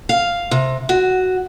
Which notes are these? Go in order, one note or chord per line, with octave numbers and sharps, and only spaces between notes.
F5
C3
F#4